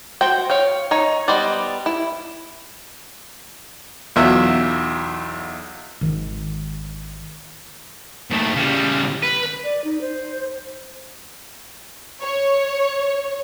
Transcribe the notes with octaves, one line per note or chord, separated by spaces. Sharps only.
F#4 C5 G5
C#5 F5 G5
D#4 C#5
G3 B3 C5 D5 D#5
E4
B1 E2 F#3 F4 E5
G#1 D#3
D#2 A3
C#3 G3
B4
D5
D#4
C5
C#5